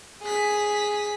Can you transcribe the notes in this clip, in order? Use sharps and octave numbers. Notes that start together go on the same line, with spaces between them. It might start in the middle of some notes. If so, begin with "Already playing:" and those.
G#4 B6